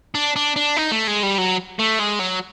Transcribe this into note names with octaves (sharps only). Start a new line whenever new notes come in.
D4
D4
D4
D#4
A3
G#3
G3
F#3
A3
G#3
F#3